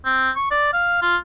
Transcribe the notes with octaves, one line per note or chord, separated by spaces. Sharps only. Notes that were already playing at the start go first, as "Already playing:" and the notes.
C4
C#6
D5
F5
F4